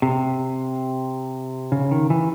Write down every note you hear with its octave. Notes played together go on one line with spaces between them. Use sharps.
C3
C#3
D#3
E3